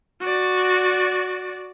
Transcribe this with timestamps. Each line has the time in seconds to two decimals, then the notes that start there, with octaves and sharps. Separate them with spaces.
0.20 F#4 D5